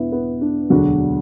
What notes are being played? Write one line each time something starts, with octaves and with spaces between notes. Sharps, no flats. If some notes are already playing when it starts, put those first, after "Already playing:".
Already playing: E1 B3 D4 E4
B3
D4
E1 D2 D3 F#3 D4 F#4